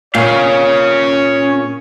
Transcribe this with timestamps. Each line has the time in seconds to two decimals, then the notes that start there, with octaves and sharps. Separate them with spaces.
0.15 A#2 C#4 C#5 F5